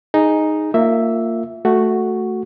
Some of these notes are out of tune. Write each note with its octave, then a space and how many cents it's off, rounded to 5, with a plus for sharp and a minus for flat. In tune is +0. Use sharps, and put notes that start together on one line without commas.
D#4 +0 G#4 +0
A#3 -25 F4 +0 E5 +0
A3 +0 F#4 +0